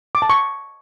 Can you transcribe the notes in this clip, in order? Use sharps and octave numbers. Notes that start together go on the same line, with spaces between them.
D6
A5
C#6